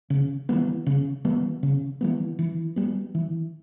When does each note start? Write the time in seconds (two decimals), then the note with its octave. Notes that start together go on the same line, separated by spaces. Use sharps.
0.10 C#3
0.49 E3 G3 B3
0.87 C#3
1.25 E3 G3 B3
1.63 C#3
2.01 E3 G3 B3
2.39 E3
2.76 G3 B3
3.15 E3